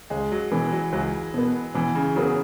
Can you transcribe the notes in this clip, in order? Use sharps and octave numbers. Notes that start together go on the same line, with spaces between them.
C#2 G#3
F#3
B2 E3 B3
F#3
C#2 F#3
B2 B3
B2 E3
C#3
C#3 F#3 B3 G#4